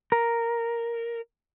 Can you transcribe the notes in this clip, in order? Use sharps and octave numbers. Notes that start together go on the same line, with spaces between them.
A#4